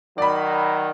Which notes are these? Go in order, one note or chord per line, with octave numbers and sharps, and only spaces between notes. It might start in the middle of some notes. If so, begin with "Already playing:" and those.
D#3 F#3 D5 B5